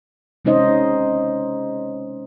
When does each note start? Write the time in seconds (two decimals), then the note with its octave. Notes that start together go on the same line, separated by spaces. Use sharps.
0.45 C3 G#3 C#4 D#4 C5 D#5